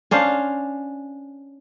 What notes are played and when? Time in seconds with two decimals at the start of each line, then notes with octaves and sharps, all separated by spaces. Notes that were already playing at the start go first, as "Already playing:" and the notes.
0.11 C#4 D4 C5 F5